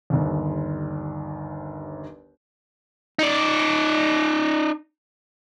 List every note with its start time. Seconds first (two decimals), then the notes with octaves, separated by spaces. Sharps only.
0.10 G1 D#2
3.19 D#4 D5